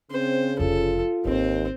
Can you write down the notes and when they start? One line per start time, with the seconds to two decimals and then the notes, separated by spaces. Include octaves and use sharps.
0.11 C#3 C4 C5
0.59 F1 F2 F4 A4
1.25 G#1 D#2 D#3 C4 C5